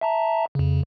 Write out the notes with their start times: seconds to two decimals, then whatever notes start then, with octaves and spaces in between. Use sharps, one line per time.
0.01 E5 A5 A#5
0.55 F2 C#3